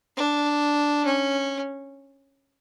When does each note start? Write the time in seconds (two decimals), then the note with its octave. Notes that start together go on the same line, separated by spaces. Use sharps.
0.17 D4
1.05 C#4